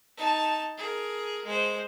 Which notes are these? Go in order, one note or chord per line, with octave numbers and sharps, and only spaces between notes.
D#4 A5
G#4 A#4
G#3 C5